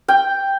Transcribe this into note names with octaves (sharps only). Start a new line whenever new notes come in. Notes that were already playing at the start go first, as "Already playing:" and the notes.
G5